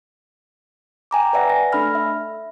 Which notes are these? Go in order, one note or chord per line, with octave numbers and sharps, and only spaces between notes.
G5 G#5 A#5 D6
B4 D5 E5 F#5 A#6
A#6
A3 D4 A4 B5 F6 A#6
E5